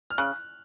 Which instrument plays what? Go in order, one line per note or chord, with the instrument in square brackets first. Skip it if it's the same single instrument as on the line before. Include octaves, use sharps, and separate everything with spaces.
[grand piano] F6
[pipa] C#3 [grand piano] F#6